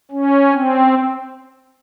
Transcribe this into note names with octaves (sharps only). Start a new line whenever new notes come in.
C#4
C4